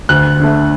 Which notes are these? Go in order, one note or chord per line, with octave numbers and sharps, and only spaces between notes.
D2 F#6
D3 A3